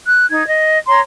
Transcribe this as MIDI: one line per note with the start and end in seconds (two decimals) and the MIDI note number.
0.08 0.29 90
0.29 0.45 63
0.29 0.45 92
0.48 0.77 75
0.87 1.00 73
0.87 1.00 82
0.87 1.00 84